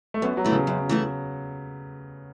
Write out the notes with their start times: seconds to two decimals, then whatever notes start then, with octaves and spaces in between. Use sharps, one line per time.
0.14 A3
0.22 F#2 B3
0.37 F#3
0.44 E3 A3 E4
0.52 C#3
0.67 F#2
0.89 E3 A3 E4